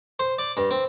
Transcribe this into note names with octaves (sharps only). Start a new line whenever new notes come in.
C5
D5
G2
C4